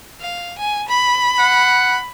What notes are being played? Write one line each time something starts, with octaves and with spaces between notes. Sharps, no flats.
F5
G#5
B5
F#5